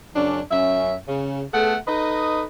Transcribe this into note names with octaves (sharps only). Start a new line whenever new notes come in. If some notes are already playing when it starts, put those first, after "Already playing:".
F#2 C#3 C#4 D4
F#2 C#4 E5
C#3
A3 B3 G#4 A4 F#5
D#4 A4 B4 D#5